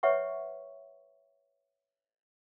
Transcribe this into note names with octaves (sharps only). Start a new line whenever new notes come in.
B4 C#5 E5 F#5 C#6